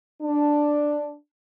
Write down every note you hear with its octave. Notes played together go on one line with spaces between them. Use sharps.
D4